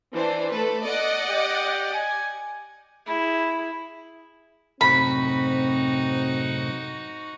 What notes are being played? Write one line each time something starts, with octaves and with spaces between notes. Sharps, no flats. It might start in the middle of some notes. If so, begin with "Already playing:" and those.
E3 D4 C5
A3 A4 B4
D5 D#5 F#5
G4
G#5
E4 G#4
F#2 A2 C3 C4 D#4 F#4 B5